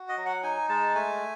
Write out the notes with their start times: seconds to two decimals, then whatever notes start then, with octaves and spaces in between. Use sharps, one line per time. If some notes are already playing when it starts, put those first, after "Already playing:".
Already playing: F#4
0.09 D#5
0.17 F#3
0.26 F#5
0.43 D#4 G#5
0.69 G#3 A5
0.95 A3 G#5